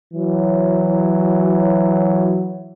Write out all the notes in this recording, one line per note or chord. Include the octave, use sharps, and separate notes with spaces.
E3 F#3